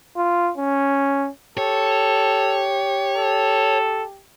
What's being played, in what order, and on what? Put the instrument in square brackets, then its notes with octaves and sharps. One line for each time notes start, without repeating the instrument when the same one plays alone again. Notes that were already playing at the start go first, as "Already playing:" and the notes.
[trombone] F4
C#4
[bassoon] G4 [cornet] A4 [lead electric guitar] C#5
[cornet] A4